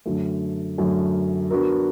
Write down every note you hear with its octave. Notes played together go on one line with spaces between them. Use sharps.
F#2 D3 F#3 A3
F#2 D3 F#3 A3
F#3 B3 D4 F#4 A#4